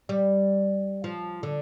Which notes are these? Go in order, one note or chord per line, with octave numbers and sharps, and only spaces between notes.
G3
F3
D3